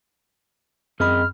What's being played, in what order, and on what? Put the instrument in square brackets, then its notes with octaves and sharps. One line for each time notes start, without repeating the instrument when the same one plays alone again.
[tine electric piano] F#2 B5 [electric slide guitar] C4 G#4 D#5 [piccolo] F6